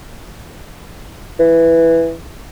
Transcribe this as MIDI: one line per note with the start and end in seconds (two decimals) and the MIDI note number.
1.39 2.13 52